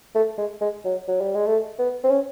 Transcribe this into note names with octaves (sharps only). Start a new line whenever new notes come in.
A3
G#3
G#3
F#3
F#3
G3
G#3
A3
B3
C4
C#4